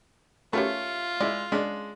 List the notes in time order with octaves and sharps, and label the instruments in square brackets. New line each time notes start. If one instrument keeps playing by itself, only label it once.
[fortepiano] A3 C#4 [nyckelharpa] F4 [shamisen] G4 A#4 B4
[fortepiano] G#3 E4 [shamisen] D5
[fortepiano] G#3 D4 [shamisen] C#4